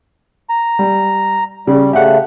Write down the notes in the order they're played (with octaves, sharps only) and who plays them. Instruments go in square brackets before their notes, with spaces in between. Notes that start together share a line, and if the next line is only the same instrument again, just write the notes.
[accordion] A#5
[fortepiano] G3
[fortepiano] C#3 [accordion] G3
[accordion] C#3 A3 [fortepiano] G4 F#5